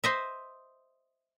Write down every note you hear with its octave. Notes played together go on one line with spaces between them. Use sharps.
C5 D#5 E5